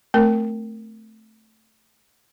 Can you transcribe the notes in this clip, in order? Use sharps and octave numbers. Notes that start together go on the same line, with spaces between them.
A3 C4 A#4